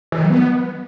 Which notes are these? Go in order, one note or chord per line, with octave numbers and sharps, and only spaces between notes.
E3
D#3
F#3
B3